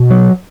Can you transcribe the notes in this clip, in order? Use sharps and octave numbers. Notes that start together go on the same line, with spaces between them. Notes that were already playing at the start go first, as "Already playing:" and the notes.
Already playing: B2
F#3